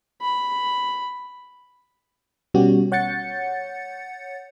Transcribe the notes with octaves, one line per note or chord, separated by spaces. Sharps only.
B5
B2 G3 B3 C#4 F#4 G4
C#5 F#5 G6 A6 C#7